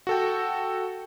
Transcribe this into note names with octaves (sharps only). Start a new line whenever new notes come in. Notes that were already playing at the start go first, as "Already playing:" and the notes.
F#4 A4 G5